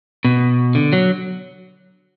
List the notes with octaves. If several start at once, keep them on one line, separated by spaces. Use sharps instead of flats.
B2
D3
F#3